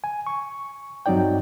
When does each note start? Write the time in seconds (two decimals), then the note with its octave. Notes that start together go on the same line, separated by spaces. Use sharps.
0.04 G#5
0.27 C#6
1.06 G2 F#3 C4 D#4 D5 G5